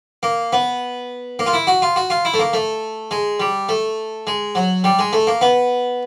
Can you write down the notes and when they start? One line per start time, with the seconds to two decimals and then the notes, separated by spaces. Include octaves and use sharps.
0.23 A#3
0.53 B3
1.39 A#3
1.46 F4
1.53 E4
1.67 F#4
1.82 F4
1.96 F#4
2.10 F4
2.25 E4
2.34 A3
2.39 A#3
2.53 A3
3.11 G#3
3.40 G3
3.69 A3
4.27 G#3
4.55 F#3
4.84 G3
4.99 G#3
5.13 A3
5.27 A#3
5.41 B3